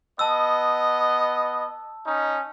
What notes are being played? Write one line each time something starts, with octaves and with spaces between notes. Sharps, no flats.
B3 D#5 A5 E6
C#4 D#4